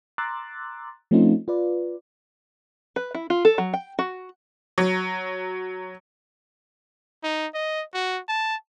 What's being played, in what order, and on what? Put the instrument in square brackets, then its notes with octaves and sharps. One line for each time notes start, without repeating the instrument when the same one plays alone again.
[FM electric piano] A#5 C6 D6 E6 F#6 A6
F3 A3 C4 C#4 D#4 F4
F4 B4 D5
[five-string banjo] B4
E4
F4
A4
F#3
G5
F#4
[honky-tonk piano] F#3
[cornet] D#4
D#5
F#4
A5